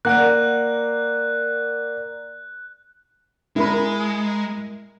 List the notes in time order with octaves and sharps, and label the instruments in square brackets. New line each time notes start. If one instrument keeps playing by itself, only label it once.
[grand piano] A#3 F#5 [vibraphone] A#4 D5 [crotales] F#6
[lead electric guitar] G#3 [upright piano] E4 A#4 B5